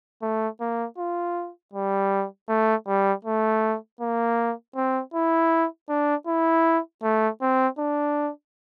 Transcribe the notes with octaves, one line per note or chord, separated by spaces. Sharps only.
A3
A#3
F4
G3
A3
G3
A3
A#3
C4
E4
D4
E4
A3
C4
D4